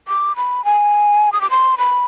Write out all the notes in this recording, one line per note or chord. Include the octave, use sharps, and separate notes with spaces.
D6
B5
G#5
D#6
D6
C6
B5